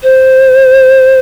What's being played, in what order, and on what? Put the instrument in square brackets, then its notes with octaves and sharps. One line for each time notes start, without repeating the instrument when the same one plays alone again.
[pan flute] C5